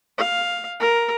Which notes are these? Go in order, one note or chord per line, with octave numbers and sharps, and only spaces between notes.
F5
A#4